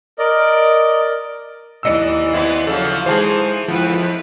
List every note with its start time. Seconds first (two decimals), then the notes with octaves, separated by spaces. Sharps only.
0.19 A#4 D5 D#5
1.83 D#2 E3 D5 D#5 E6
2.33 B3 C4 E4
2.67 C#3 F3 F#3 A4
3.06 E3 G#3 D#4 G4 G#4 C5 A5
3.68 F2 F3 B3 E4 B4